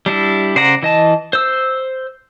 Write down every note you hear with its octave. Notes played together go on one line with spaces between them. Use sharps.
G3 D4 E4
C#3 C5 D5 F#5 A#5
E3 D#5 A5
C5 E6